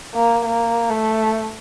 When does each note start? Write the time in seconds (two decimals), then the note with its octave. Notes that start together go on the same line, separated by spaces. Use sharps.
0.15 A#3
0.45 A#3
0.90 A3